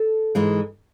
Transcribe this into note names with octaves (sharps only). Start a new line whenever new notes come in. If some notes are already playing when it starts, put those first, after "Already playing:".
Already playing: A4
G#2 E3 G#3